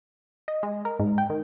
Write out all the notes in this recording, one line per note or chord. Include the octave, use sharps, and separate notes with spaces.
D#5
G#3
A#4
G#2
G5
D#3